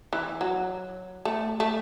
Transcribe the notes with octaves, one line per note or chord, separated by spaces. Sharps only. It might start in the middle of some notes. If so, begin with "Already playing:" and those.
E3
F#3
A3
A3